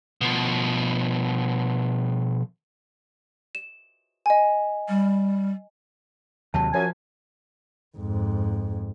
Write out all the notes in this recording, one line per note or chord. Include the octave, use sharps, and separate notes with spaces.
B2 F3
E7
D#5 G#5
G3
D#2 C3 F#3 A5
F#2 F3 G#5
F2 G#2